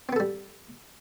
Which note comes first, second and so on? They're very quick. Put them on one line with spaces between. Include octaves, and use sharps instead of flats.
C4 B3 A4 G3